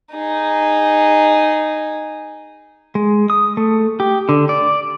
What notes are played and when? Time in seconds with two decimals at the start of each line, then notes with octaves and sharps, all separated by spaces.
0.15 D#4 G#4
2.95 G#3
3.30 D#6
3.57 A3
4.00 G4
4.29 D3
4.49 D5